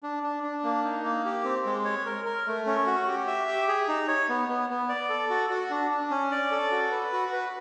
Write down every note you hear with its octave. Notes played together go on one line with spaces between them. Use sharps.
D4
D4
D4
A#3
D#4
A#3
G4
C4
G#3
C#5
A#4
A#4
A3
C#4
F#4
G4
E5
G4
G#4
D#4
C#5
B3
B3
B3
D5
A4
F#4
F#4
D4
D4
C#4
D5
A4
F#4
B4
F#4
B4